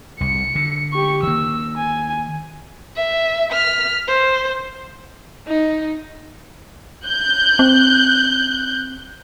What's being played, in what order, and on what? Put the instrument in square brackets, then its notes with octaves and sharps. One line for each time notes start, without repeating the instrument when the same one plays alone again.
[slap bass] C2 [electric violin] C#7
[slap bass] D3
[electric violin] G4 C#6
[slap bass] D#3 A#3 [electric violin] E6
[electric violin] G#5
[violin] E5
F6 B6
C5
[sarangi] D#4
[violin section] F#6 G6
[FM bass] C4